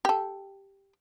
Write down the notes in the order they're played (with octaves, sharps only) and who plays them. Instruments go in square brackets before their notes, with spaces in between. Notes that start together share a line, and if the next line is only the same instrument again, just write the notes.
[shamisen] G4 A4